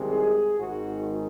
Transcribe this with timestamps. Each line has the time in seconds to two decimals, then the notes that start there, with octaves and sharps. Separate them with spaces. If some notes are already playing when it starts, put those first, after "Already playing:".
Already playing: C2 C3 D#3 G#3
0.10 G#4
0.59 G#1 G#2 D#3 G#3 F#4